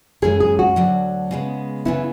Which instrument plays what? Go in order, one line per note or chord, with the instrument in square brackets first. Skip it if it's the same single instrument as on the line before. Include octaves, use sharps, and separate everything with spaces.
[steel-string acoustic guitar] F#2 E3 G#3 C#4 [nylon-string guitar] G#4
[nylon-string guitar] G#4
F#4
[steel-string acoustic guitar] D2 D3 F#3
C#3 G#3 B3
[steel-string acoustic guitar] C#3 E3 B3 [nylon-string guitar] E4